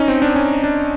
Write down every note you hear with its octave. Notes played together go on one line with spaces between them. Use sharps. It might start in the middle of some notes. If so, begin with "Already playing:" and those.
Already playing: C#4 D#4
C4
D4
C#4
D4